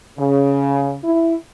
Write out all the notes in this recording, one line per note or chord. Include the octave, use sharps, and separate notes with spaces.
C#3
E4